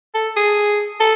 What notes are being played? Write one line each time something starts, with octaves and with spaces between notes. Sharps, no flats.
A4
G#4
A4